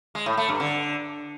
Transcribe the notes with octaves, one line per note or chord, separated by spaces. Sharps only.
G#3
A2
A3
G2
D3